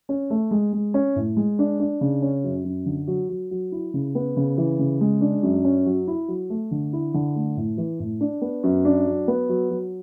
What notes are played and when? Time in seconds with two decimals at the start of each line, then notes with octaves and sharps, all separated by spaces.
0.09 C#4
0.30 A3
0.51 G#3
0.73 G#3
0.94 C#4
1.16 A2
1.36 G#3
1.59 D4
1.80 D4
2.01 C#3
2.22 C#4
2.44 F#2
2.65 F#2
2.86 D3
3.07 F#3
3.29 F#3
3.51 F#3
3.72 E4
3.94 C#3
4.15 B3
4.37 C#3
4.58 E3
4.79 C#3
5.01 G#3
5.21 D4
5.43 F#2
5.65 C#4
5.86 F#3
6.07 E4
6.28 F#3
6.50 A3
6.71 D3
6.93 E4
7.14 D3
7.36 A3
7.57 A2
7.78 E3
7.99 A2
8.21 D4
8.42 B3
8.64 F#2
8.85 D4
9.06 F#3
9.28 B3
9.49 F#3
9.71 F#3